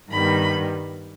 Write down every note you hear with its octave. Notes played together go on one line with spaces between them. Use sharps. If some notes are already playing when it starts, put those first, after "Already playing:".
G2 D#3 G3 B3 B5